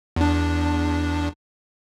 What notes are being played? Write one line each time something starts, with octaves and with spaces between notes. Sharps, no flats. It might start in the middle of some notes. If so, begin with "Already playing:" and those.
E2 D4